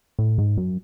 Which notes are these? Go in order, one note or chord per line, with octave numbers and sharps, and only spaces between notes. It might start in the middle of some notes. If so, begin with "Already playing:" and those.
A2
G#2
F#2